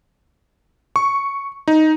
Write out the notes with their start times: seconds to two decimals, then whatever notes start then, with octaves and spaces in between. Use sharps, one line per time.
0.96 C#6
1.68 D#4